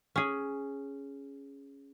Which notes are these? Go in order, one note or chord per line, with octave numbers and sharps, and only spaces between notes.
C#4 G#4